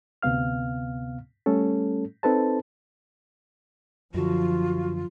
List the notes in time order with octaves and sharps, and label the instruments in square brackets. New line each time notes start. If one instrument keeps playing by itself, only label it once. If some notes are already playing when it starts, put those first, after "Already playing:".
[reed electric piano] D2 C3 B3 F5 F6
G3 A3 C#4 A4
C4 D#4 A4 B4 C5 A5
[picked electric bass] F#2 D3 [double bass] F3 [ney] F4 [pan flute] F#4